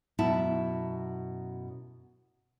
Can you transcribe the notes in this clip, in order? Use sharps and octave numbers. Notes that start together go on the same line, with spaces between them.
F#2 B2 E4 F#4 A5